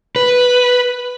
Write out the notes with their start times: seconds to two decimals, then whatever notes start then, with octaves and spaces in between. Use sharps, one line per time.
0.16 B4